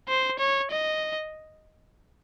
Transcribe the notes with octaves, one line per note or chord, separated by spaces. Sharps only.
C5
C#5
D#5